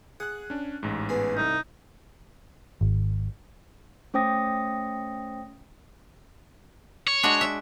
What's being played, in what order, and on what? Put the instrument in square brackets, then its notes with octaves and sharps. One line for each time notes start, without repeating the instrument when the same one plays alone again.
[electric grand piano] G#4 F#6 [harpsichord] F#5
[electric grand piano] C#4 D4
A1 G#2
[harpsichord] B3 G#4
[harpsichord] C2 [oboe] D#4
[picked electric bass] G#1
[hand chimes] A3 C#4 C5 G5 D#6 A#6
[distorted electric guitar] C#5
[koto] G#3 D4 F#4
E5